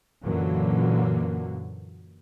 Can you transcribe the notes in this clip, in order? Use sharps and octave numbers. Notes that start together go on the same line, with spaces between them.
F#2 A#2 D3 E3 F#3 A#3